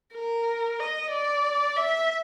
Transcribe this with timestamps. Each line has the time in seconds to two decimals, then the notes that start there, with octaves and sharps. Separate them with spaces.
0.15 A#4
0.80 D#5
1.11 D5
1.77 E5